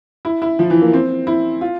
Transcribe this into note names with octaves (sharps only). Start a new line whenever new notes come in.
E4
E4
F3
E3
A#3
C4
E4
F4